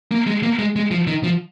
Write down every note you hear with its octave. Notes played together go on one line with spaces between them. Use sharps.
A#3
G#3
A#3
G#3
G#3
F3
D#3
F3